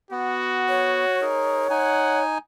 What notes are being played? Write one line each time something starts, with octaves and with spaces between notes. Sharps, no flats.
B3 F#4
C#5
D#4 G#4 A#4
D#4 F#5 G#5